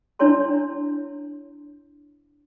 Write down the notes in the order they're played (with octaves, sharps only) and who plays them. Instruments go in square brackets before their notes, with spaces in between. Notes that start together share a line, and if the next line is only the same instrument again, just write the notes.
[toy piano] D4 E4 C#5 A5 C6